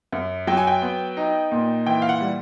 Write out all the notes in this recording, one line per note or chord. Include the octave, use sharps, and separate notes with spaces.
F#2
F#3 G5
G#5
G5
B3
D#4
A#2
E3 G5
F5
F#5
G3